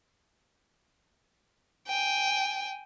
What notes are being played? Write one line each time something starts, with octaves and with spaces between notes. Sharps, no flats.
G5 G#5